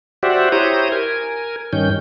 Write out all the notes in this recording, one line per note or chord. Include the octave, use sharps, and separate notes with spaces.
F#4 G4 C5 D5 E5 F#5
E4 G4 C5 C#5 A#5 D#6
A#4 G#5
G2 D#3 C#4 G6